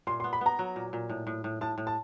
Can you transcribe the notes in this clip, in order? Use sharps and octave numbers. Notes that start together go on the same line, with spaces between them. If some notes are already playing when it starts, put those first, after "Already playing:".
A#2 C6
C6
B3
B5
B3 A#5
F#3
A#2
A#2
A2
A2
A2
A2 A5
A2
A5